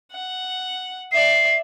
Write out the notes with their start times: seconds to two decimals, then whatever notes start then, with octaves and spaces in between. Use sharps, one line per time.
0.12 F#5
1.12 D5 E5 C7